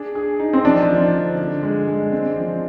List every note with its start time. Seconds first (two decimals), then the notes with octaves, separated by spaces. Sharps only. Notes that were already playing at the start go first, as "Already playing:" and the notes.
Already playing: D4 G#4
0.15 G#4
0.40 D#4
0.53 C4
0.65 F3 D4
0.89 F3
1.14 D3
1.38 D3
1.63 G#3
1.87 G#3
2.12 C4
2.36 F3